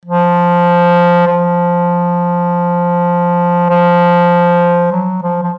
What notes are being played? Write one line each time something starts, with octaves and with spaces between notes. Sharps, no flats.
F3
F3
F3
F#3
F3
F3